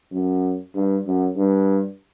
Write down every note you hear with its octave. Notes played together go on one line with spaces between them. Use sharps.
F#2
G2
F#2
G2